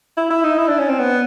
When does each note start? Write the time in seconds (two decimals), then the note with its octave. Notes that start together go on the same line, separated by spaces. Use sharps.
0.17 E4
0.31 E4
0.44 D#4
0.58 E4
0.69 D4
0.79 C#4
0.89 C4
0.99 B3